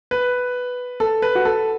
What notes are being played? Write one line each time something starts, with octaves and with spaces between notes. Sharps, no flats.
B4
A4
B4
F#4
A4